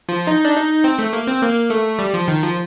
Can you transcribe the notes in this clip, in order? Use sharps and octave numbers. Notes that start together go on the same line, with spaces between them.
F3
D#4
D4
D#4
C4
A3
A#3
C4
A#3
A3
G3
F3
D#3
F3